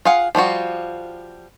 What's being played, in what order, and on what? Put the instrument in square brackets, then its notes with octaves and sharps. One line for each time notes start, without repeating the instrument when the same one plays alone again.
[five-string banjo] F4 G#4 F5 F#5
F3 G3 F4 F#4